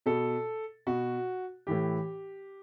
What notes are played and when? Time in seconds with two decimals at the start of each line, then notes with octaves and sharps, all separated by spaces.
0.06 B2 A4
0.87 B2 F#4
1.67 A2 E3 G4